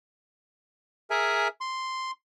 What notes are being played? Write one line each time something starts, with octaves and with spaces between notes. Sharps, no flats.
G#4 A#4 E5 G#5
C6